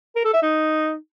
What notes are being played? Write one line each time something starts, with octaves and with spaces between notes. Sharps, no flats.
A#4
A4
E5
D#4